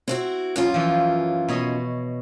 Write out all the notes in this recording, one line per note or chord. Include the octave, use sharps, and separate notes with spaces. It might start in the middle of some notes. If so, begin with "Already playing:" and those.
C4 E4 F#4
F#2 C#4 F4
E3 F3
B2 C#5 D#5